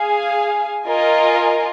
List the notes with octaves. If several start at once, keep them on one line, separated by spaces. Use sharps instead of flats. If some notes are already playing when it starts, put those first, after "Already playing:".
Already playing: G#4 F5 G#5
F4 A#4 D#5 G#5